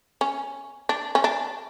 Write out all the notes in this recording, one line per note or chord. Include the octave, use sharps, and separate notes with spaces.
C#4
D4
C#4
D4